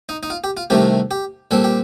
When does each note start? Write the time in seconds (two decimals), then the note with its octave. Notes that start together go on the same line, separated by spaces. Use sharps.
0.09 D#4
0.23 D#4
0.30 F4
0.44 G4
0.57 F4
0.70 C2 C3 D#3 A3 G4
1.11 G4
1.51 A#2 G3 C4 A4
1.64 G4